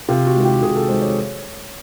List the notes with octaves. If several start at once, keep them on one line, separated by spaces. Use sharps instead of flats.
C3 F4
F#4
D#3 G#3
G4
C3 G#4
A4
D#3 G#3 C5
C#5